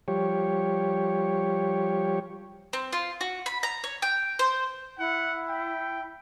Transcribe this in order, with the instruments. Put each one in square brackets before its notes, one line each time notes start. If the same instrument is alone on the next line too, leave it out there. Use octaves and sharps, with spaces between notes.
[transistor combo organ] F3 G3 G4 C#5
[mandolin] C4
F4
F#4
B5
A#5
C#5
G5
C5
[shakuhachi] E4 [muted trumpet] F#5
[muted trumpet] G5